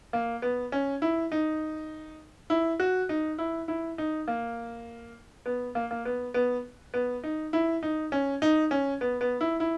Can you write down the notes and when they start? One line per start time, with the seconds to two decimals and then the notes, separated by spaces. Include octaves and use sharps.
0.13 A#3
0.42 B3
0.72 C#4
1.02 E4
1.32 D#4
2.50 E4
2.80 F#4
3.09 D#4
3.38 E4
3.68 E4
3.98 D#4
4.28 A#3
5.46 B3
5.75 A#3
5.91 A#3
6.05 B3
6.34 B3
6.94 B3
7.24 D#4
7.53 E4
7.83 D#4
8.12 C#4
8.42 D#4
8.71 C#4
9.01 B3
9.21 B3
9.41 E4
9.60 E4